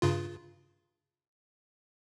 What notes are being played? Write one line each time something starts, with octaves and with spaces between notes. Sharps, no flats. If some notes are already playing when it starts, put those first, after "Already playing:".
G2 C#3 F4